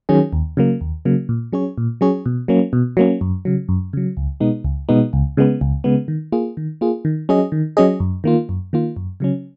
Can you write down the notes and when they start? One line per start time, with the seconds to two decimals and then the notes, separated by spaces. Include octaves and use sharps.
0.09 D#3 F#3 C#4 G#4
0.33 D#2
0.57 C#3 F#3 A#3
0.81 D#2
1.05 C#3 F#3 A#3
1.29 A#2
1.52 F#3 C#4 G#4 C#5
1.78 A#2
2.01 F#3 C#4 G#4 C#5
2.26 B2
2.48 F#3 A#3 C#4
2.73 B2
2.97 F#3 A#3 C#4
3.21 F#2
3.45 C#3 F#3
3.69 F#2
3.93 C#3 F#3
4.17 C#2
4.40 B2 G#3 B3 D#4
4.64 C#2
4.89 B2 G#3 B3 D#4
5.13 C#2
5.37 C#3 G#3 B3
5.61 C#2
5.84 C#3 G#3 B3
6.08 D#3
6.32 A#3 F4 G#4
6.57 D#3
6.81 A#3 F4 G#4
7.05 D#3
7.29 F#3 C#4 G#4 D#5
7.52 D#3
7.77 F#3 C#4 G#4 D#5
8.00 F#2
8.24 D#3 A#3 F4
8.49 F#2
8.73 D#3 A#3 F4
8.96 F#2
9.20 C#3 F#3 C#4